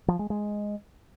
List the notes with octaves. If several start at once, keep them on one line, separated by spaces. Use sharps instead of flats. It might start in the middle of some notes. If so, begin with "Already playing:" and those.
F3
G#3
G#3